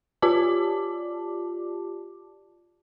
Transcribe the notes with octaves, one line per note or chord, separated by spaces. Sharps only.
F4 G4 D5 A5 D6